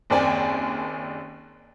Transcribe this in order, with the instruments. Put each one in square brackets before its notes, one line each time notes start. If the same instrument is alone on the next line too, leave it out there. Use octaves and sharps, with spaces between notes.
[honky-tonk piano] F#1 D#2 C4 D5 G5 G#5